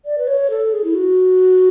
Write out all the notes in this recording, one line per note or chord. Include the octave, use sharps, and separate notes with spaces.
D5
B4
C#5
A4
G#4
E4
F#4